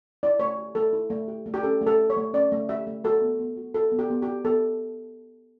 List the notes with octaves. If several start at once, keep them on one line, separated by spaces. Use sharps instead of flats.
E4 D5
A3 C#5
G4
A3 A4
E4
A3
G4
A3
G4
C#4 A4
A3
A4
G4
C#5
A3
C#4 D5
A3
G4 E5
A3
F#4 A4
B3
B3
F#4
F#4 A4
B3
G4
B3
G4
F#4
B3 A4